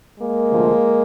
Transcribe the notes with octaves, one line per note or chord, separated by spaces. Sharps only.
G#3 A#3
D2 C3 F3